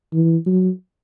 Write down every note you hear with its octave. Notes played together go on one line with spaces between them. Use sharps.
E3
F#3